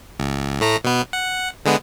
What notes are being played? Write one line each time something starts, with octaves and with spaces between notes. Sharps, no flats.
C#2
A2 A3 A#5
B2 B3
F#5
D3 G#3 B3